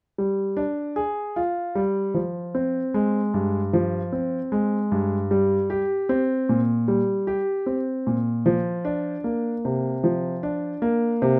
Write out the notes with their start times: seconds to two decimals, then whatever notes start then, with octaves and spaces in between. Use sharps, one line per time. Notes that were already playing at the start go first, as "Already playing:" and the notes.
0.18 G3
0.57 D4
0.96 G#4
1.36 F4
1.75 G3
2.14 F3
2.55 C4
2.94 G#3
3.34 G2
3.73 F3
4.12 C4
4.52 G#3
4.92 G2
5.31 G3
5.70 G4
6.09 C4
6.49 A#2
6.88 G3
7.27 G4
7.66 C4
8.07 A#2
8.46 F3
8.85 D4
9.24 A#3
9.65 C3
10.04 F3
10.43 D4
10.82 A#3
11.22 C3